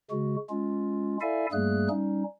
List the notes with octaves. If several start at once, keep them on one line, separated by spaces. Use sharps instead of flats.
C#3 G#3 F#4
G#3 C#4 F4
E4 A4 D5 E5 F5 G#5
G2 G3 A3 A#3 G#4 F#6
G3 C#4 D#4